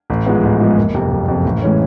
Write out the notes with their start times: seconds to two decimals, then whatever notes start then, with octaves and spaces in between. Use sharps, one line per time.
0.10 A1
0.27 G#2 F3 G#3 B3
0.43 A1
0.60 G#2 F3 G#3 B3
0.77 F#1
0.94 F2 C3
1.11 F#1
1.28 F2 C3
1.45 A1
1.62 A2 E3 G#3 C#4